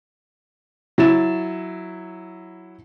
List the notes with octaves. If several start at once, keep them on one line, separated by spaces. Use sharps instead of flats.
F#3 E4 A6 E7